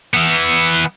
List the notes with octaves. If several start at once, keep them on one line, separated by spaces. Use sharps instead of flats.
E3 B3